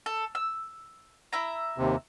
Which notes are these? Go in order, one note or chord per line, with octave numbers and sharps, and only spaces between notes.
A4
E6
E4 E5 A#5
D#2 C3